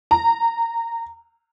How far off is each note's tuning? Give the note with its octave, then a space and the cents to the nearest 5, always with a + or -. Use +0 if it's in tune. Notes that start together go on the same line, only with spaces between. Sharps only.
A#5 -15